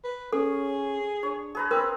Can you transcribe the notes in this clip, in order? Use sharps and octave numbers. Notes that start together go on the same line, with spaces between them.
B4
C#4 G#4 A4
D4 C#5
G#4 B4 A#5
C4 A#4 B4